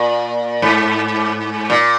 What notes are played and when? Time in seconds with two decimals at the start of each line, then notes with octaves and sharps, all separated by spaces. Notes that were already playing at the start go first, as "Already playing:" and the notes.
Already playing: A#2
0.62 G#2
1.70 A#2